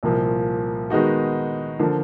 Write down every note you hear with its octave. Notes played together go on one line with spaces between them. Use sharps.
C2 A#2 F3 A#3
D#3 G#3 B3 D#4 F#4
D3 F3 A#3